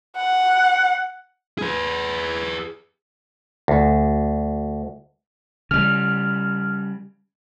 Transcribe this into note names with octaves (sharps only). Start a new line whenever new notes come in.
F#5
G#4 B4
D2
C#3 G3 F6